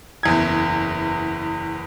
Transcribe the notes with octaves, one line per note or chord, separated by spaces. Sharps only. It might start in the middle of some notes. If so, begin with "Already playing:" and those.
F#1 E2 G#6